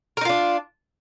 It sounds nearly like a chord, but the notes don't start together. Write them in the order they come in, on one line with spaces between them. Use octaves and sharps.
A#4 D#4 F4 D4